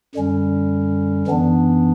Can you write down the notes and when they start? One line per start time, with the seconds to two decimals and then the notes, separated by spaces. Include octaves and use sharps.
0.15 F#2 D3 G3 C#4
1.27 F#2 E3 B3 D4